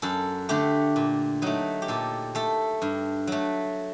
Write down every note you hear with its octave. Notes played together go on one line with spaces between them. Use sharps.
F#2 A4
D3 A3 G4
A#2
F#3 A3 D#4
G4
A#2 A4
A3 A4
G2
F#3 A3